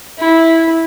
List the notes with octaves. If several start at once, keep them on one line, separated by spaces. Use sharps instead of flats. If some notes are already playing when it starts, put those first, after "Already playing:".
E4